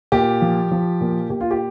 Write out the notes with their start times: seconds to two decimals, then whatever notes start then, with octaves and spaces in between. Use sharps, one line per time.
0.12 A#2 G4
0.42 F3
0.71 F3
1.01 A#2
1.30 A#2 G4
1.41 F4
1.51 G4